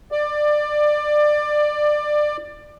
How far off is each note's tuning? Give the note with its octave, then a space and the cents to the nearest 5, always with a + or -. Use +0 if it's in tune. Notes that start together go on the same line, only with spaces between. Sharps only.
D5 +20